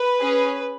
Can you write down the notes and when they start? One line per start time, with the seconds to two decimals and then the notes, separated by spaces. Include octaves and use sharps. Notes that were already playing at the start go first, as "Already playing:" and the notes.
Already playing: B4
0.21 C#4 G#4